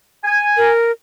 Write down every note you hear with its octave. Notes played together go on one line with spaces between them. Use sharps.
G#5
A#4